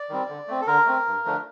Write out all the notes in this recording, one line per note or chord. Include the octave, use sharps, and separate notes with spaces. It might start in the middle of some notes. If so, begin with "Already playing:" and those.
Already playing: D5
D#3 G3 C4
D3
A3 C4
A4
D3 A#4
A3 C4
G2
D3 F3 A3 D4